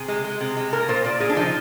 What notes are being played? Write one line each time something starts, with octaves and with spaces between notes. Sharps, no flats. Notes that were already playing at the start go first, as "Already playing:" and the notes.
Already playing: C3 G#4
G#3
G#3
C3
G#3
A#2 A#4
A#2 C5
A#2 D5
A#2 G#4
D4
F3 D#4